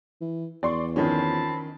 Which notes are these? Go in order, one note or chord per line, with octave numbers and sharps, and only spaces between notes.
E3
E2 D5 C6 C#6
D#3 F3 C4 C#4 A5 B5